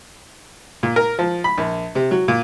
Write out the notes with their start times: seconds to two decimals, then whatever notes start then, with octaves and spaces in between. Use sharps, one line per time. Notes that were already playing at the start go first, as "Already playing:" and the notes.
0.83 A#2
0.96 A#4
1.19 F3
1.44 B5
1.58 A#1
1.95 C3
2.11 F#3
2.28 A#2